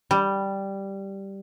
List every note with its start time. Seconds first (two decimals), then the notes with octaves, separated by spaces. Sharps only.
0.11 G3